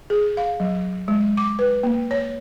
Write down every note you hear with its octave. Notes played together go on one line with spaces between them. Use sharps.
G#4
F5
F#3
G#3
D6
B4
A#3
C#5